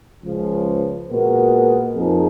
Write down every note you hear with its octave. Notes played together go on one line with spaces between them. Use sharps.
C#2 C#3 F3
A#2 G#3 B3 F#4 A#4
F2 F3 A#3 D#4 G#4